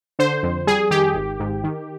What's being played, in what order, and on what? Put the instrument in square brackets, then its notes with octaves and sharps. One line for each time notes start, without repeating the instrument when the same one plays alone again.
[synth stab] D3 C5
F2
G3 G#4
D#3 G4
G#1
G#2
D#3